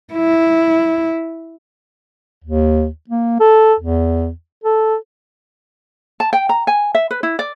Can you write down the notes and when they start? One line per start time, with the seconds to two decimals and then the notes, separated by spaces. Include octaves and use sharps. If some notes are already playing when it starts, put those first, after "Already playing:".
0.14 E4
2.44 D#2
3.10 A#3
3.40 A4
3.80 E2
4.64 A4
6.20 A5
6.33 G5
6.49 A#5
6.67 G#5
6.95 E5
7.11 B4
7.23 E4
7.39 D5